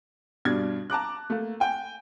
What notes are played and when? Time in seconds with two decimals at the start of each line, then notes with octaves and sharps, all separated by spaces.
0.45 G2 B2 D4 G#6
0.90 A5 A#5 D6 F#6
1.30 A3 A#3
1.60 G5 G#5